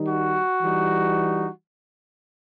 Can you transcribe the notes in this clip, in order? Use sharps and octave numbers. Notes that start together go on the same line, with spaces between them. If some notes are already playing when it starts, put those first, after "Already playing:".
Already playing: D#3 G3 D#4
F#4
E3 G3 D#4